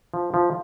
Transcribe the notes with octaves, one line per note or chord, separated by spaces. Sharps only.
F3
F3